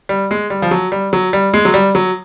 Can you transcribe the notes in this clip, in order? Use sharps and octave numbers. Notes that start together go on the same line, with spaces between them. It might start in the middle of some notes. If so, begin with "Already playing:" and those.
G3
G#3
G3
F3
F#3
G3
F#3
G3
G#3
F#3
G3
F#3